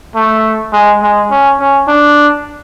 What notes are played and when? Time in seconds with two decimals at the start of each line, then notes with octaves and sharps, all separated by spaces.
0.16 A3
0.73 G#3
1.02 G#3
1.31 C#4
1.60 C#4
1.87 D4